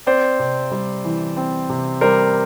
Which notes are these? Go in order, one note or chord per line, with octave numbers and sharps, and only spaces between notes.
C4 C5 D5
C3
G3
E3
C4
C3
G3 A#4 C5